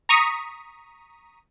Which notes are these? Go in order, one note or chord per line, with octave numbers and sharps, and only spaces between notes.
A#5 C#6 D#6 B6